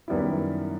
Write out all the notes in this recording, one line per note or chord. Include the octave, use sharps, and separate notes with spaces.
F#2 D#3 G3 B3 E4